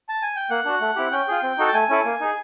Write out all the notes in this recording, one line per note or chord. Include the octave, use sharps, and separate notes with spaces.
A5
G#5
G5
A#3 F#5
D4 F#4
A3
C4 E4 G4
C#4 G5
F4 G#4
C4
D#4 F#4 A4
A5
A3 G#5
C#4 E4 A4
A#3
D#4 G#4